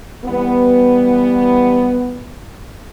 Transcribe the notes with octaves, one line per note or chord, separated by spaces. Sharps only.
E3 G3 B3